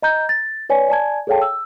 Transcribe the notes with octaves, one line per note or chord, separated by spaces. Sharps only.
D#5 A#5 G6
A6
B4 C#5 D5 G#5
D5 G#5 A5 G#6
G#4 A4 C#5 F5 G5 A5
E6